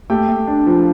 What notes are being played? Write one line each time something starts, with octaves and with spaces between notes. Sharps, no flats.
A3 G4 G5
A3
D4
F3